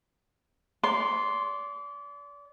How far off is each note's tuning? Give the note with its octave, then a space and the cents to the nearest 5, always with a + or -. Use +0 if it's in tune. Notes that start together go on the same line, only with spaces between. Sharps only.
D5 -35 C6 +0